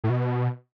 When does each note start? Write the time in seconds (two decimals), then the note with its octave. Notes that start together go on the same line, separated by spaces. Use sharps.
0.04 A2
0.10 B2